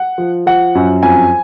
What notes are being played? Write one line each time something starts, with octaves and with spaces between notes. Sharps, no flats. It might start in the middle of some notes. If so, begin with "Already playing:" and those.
Already playing: F#5
F3
F3 F#5
F#2
F2 G#5